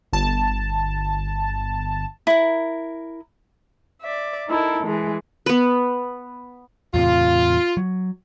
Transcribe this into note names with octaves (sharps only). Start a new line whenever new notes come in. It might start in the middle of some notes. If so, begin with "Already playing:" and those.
G1 A5
E4 A#4
D5 E5
D#4 E4 A4 A#4
E3 G#3
B3 B4
E2 A2 C3 F4
F#3